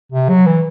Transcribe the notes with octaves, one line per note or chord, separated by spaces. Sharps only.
C3
F#3
E3